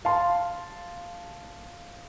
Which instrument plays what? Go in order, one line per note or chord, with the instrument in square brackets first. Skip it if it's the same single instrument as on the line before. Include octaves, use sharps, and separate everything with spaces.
[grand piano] F5 A5 C6